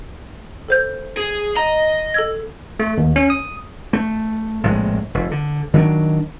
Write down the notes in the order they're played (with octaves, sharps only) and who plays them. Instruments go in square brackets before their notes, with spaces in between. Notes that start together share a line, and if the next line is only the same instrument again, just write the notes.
[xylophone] A4 C5 G6
[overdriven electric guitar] G#4
[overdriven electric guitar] D#5 [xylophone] A#5
[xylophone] A4 E6 G#6
[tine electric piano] A3
D#2
C#4
D#6
[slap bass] A3
A#1 A2 C3 G#3
F1
D3
D#3 F#3 D4